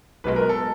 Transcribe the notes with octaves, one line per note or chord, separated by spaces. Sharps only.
B1 B2 G#3 B4
A#4
A4